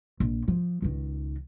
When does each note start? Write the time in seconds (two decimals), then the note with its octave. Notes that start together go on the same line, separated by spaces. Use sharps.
0.20 A#1
0.48 F3
0.82 C#2 D#3